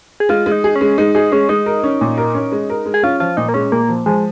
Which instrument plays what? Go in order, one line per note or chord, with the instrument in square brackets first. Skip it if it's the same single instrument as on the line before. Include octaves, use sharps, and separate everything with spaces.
[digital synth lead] G#4
[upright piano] G#3 [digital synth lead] F4
[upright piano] G#3
[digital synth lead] D#4
[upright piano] G#4
[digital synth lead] C#4
[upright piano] G#3
[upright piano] G#3 [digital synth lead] D#4
[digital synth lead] D#4 [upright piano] G#4
[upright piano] G#3 [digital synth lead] C#4
[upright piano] G#3 [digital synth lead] D#4
[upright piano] A#4
C#4
A#2
A#4
C#4
G#3
A#4
G#3
[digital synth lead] G#4
[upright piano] C#4 [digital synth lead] F4
[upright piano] F3 [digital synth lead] F4
[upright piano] A#2 [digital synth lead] D#4
[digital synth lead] A#3
[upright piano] G#3 [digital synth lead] C#4
[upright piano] A#2 [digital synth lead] A#3
[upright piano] F3
[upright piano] F3 [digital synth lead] G#3